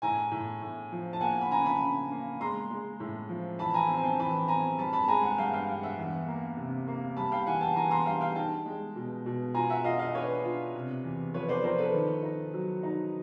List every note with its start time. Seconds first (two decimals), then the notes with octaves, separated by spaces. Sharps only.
0.02 A2 G#5 A#5
0.32 A2
0.62 A2
0.92 F3
1.13 A5
1.21 A#3 F#5 G#5
1.41 B5
1.51 C#3 G#5 A#5
1.66 A5 B5
1.80 C#3
2.11 A#3
2.40 G#3 A#5 C6
2.70 G#3
3.00 A2
3.29 F3
3.59 E3 A5 B5
3.74 G#5 A#5
3.89 C4
3.97 G#5
4.04 G5 A5
4.19 E3 A5 B5
4.48 C4 G#5 A#5
4.78 G2 A5 B5
4.93 A5 B5
5.08 G#3 G#5 A#5
5.23 F#5 G#5
5.38 G2 F5 G5
5.53 F5 G5
5.68 G2
5.83 E5 F#5
5.98 E2
6.28 A#3
6.57 C3
6.88 A#3
7.17 G3 A5 B5
7.32 F5 G5
7.47 E3 F#5 G#5
7.61 G5 A5
7.76 E3 G#5 A#5
7.91 A#5 C6
8.06 G3 F5 G5
8.21 F5 G5
8.35 D#4 G5 A5
8.66 G#3
8.96 B2
9.26 B2
9.54 F4 G#5 A#5
9.70 E5 F#5
9.84 F4 D#5 F5
9.99 D#5 F5
10.15 D4 B4 C#5
10.44 F4
10.75 C3
11.04 E2
11.34 F3 B4 C#5
11.48 C5 D5
11.63 F3 A#4 C5
11.78 A4 B4
11.94 D#3
12.23 D#4
12.54 F#3
12.83 D#4